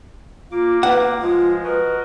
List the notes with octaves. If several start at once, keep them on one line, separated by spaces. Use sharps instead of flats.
A#3 F4 D6
B4 F#5
F3 G#3 F4
F#4 A#4 B4 D#5